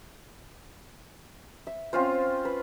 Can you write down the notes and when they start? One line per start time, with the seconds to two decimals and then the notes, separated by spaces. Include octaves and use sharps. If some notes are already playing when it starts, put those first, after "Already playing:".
1.67 E5
1.93 C4 C#4 F4 C5
2.45 B4